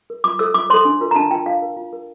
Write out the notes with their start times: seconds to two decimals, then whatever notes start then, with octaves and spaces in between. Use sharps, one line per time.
0.10 A#4
0.24 F4 D6
0.39 A4 C5 E6
0.54 F4 D6
0.70 A4 C5 C6
0.85 D4
1.01 F4 A#4
1.11 A#5
1.16 D4 A5
1.31 F4 A#4 G5
1.46 F4 F5
1.62 A#4
1.77 F4
1.93 A#4